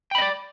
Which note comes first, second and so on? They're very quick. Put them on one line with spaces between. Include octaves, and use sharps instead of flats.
G5 B5 D#5 D5